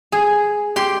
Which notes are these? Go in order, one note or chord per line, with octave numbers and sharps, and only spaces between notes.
G#4
G4 C6